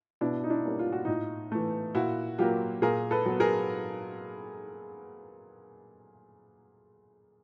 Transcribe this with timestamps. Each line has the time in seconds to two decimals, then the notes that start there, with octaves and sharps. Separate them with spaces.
0.21 B2 D4 E4
0.44 D#4
0.50 D4 E4
0.64 G3 A#3 C#4
0.79 F4
0.92 F#4
1.05 A2 D#4 F4
1.52 E3 A3
1.95 A#2 E4 F#4
2.38 F#3 A#3 F4 G4
2.82 A#2 G#4 A#4
3.11 A4 B4
3.26 F#3 B3
3.40 G#4 A#4